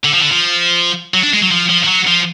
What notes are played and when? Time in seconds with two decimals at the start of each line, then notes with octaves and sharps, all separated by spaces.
0.04 D3
0.13 F3
0.21 D3
0.31 F3
1.14 F#3
1.23 D4
1.33 G#3
1.42 F#3
1.51 F3
1.69 F3
1.83 F3
1.88 F#3
2.07 F3